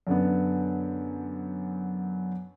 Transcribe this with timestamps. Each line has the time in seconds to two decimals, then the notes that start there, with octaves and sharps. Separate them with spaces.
0.07 F#2 D3 B3